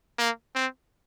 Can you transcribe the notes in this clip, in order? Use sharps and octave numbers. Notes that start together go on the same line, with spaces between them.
A#3
C4